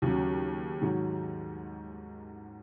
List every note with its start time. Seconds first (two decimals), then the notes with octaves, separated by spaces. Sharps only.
0.02 D#2 C#3 F#3
0.81 G#2 D#3 F#3